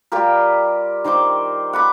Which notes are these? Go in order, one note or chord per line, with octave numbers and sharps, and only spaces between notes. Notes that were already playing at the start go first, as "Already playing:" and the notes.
G3 F4 G4 A#4
D#3 C5 G5 D6
F#5 B5 D6